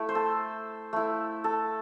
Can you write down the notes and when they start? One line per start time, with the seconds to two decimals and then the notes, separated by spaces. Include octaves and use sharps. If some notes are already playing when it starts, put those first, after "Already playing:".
Already playing: A3 E4
0.09 C5
0.15 A4
0.93 A3 E4
1.44 A4